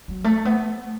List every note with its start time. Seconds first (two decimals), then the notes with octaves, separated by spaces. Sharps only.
0.08 F#3
0.24 A3
0.45 B3